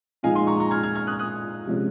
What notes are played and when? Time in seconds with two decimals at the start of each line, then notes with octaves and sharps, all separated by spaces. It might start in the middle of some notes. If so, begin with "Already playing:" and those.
0.23 A#2 F3 G#3 D#4 F5 G#5
0.35 G#5 C6
0.47 A#5 C#6
0.60 A#5 C#6
0.71 F6 G#6
0.83 F6 G#6
0.95 F6 G#6
1.07 D#6 F#6
1.19 D#6 F#6
1.67 C3 F3 G#3 C#4